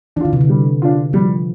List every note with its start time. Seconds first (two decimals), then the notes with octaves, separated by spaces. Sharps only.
0.16 E3 D4
0.21 D3 F4
0.33 C3
0.41 D3
0.49 G3
0.82 D4 F4
1.13 F3 G3